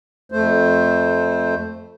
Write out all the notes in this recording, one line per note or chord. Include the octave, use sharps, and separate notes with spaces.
F2 A3 C5